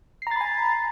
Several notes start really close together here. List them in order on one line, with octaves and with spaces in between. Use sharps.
C7 A#5 A6 B5 G#5